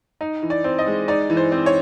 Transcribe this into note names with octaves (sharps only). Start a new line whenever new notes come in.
D#4
E3
D5
C4
D#5
G#3
D#4 D5
E3
C5
C4
C#5